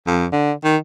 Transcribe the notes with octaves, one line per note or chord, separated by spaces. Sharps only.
F2
D3
D#3